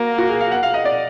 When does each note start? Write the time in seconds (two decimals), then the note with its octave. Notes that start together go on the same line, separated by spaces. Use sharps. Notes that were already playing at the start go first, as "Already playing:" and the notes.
Already playing: A#3 F#4
0.18 F#4
0.29 G#4
0.41 F5
0.51 F#5
0.63 F5
0.74 D#5
0.85 D5